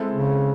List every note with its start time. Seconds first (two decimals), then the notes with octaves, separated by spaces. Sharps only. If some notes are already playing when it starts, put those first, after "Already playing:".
Already playing: G#3 C4 E4 A4
0.12 C#3